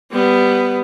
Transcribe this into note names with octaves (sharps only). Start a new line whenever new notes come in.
G3 B3